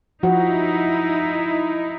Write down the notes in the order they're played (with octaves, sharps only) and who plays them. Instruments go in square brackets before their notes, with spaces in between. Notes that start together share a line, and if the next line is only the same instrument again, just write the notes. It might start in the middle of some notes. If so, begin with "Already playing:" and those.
[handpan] F3 F#4 [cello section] D#4 E4